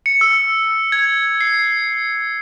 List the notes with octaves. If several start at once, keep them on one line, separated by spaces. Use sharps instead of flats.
C#7
E6
G#6
C7